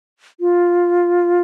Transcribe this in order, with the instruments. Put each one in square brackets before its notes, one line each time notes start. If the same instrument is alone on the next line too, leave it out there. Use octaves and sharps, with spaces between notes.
[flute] F4